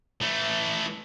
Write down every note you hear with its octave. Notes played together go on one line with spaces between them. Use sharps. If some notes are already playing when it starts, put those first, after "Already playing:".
E3 A3